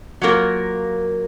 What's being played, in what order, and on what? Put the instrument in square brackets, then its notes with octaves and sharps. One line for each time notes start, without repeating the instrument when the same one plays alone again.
[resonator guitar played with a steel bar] F#3 A#3 F4 A#4